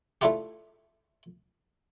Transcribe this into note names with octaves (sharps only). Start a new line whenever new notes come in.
A3 D4 E4 F4 G4